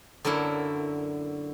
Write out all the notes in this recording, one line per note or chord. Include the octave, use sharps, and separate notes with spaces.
F#2 D3 F#3 A#3 E4